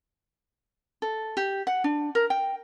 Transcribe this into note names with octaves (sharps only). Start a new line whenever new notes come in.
A4
G4
F#5
D4
A#4
G5